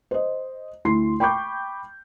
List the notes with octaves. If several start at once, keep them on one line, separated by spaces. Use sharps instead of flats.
C5 D#5
D2 E4 C6 C7
G5 B5 C#6 D6 G6